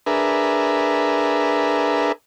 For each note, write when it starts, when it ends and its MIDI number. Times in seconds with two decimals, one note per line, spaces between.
0.06 2.12 62
0.06 2.12 68
0.06 2.12 70
0.06 2.12 71
0.06 2.12 76